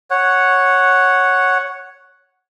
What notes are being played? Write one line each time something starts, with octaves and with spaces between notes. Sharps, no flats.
C#5 F#5